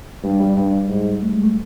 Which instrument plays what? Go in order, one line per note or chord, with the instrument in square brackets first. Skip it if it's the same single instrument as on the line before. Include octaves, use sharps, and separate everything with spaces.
[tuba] G2 [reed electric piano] G3
[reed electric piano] G3
[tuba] G2
G#2
[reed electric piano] A3
G#3
A3